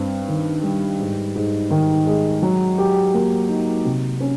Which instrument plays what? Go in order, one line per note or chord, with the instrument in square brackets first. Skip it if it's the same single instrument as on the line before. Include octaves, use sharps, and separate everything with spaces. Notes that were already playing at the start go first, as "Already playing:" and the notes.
Already playing: [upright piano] G2 C4
D#3
G3
G#2
G#2
D#3
G#3
F#3
G4
A#3
D#4
C3
C#4